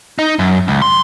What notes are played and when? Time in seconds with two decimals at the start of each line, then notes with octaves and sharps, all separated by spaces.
0.19 D#4
0.39 F#2
0.68 C#2
0.82 C6